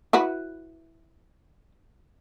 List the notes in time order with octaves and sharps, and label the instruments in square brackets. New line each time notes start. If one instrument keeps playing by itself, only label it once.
[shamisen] E4 F#4 B4